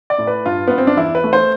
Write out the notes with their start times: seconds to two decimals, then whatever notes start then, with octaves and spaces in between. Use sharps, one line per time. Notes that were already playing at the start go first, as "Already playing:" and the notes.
0.10 D5
0.18 A2
0.27 B4
0.45 G2 F4
0.68 G2 B3
0.78 C4
0.87 D4
0.97 E2 E4
1.15 B4
1.24 A3
1.33 C5